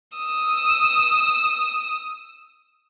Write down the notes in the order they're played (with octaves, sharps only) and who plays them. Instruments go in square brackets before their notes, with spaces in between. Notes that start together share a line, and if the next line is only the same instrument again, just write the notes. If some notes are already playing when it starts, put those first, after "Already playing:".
[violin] D#6 E6